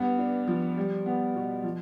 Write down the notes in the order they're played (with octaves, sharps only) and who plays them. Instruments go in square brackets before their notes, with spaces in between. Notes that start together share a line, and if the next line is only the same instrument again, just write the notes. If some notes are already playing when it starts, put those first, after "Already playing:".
Already playing: [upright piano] G2 B3
D4
F3
G3
B3
B2
F3